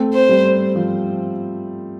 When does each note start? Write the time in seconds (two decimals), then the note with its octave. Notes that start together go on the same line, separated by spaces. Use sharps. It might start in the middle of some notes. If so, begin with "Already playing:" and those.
Already playing: A3 C4
0.14 C5
0.29 G3
0.76 F3